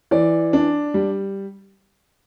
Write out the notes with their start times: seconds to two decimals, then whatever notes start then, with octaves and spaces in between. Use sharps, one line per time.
0.11 E3 D5
0.53 D4
0.94 G3